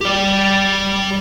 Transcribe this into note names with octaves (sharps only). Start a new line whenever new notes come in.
G4 D5